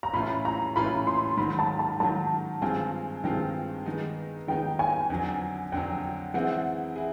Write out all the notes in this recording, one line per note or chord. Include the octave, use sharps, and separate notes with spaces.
A#5
A2 E3 A3 C#4 F4 B5
A#5
A2 E3 A3 C#4 F4 B5
C6
G#2 D#3 F#3 B5
A5
A5
G#2 D#3 F#3 A5
G2 D#3 G#3 C4 F4 G#5
G2 D#3 G#3 C4 F4 G5
D#3 G#3 B3 D#4
D#3 G#3 B3 D#4 G5
G#5
F2 D3 F#3
F2 D3 F#3 G5
E3 G#3 C4 E4 G#4 F#5
E4 G#4